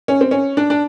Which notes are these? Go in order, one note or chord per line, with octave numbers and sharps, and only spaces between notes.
C#4
C4
C#4
D4
D4